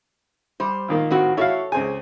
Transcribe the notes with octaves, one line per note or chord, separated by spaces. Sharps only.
G3 C5
A#2 D#3 A#3
A2 C4 F#4
E4 F#4 A4 C#5 F5
C#2 C4 G#4 G#5